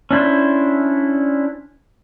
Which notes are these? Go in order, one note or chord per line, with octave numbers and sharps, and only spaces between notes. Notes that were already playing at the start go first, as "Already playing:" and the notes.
C#4 D4 E4 C5